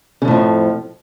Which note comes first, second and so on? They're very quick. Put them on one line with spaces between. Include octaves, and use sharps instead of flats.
C#3 F2 A2 F3